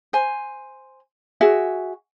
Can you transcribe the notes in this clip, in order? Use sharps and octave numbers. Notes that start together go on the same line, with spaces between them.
C5 G#5
F#4 G#4 E5